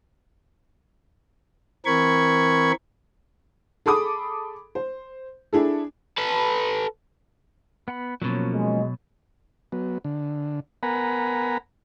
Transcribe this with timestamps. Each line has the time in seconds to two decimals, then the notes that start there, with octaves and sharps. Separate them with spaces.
1.86 E3 C4 A#4 B5 C#6 G#6
3.86 G#4 A4 B5 D6 D#6
4.75 C5
5.53 D4 E4 G#4 A4
6.18 A4 B4
7.88 B3 F#5 B5
8.22 B2 F3 F#3 A#3 C#4
8.54 G#3
9.72 F#3 B3
10.04 D3
10.83 B3 A#4 F#5 G#5 A#5 B5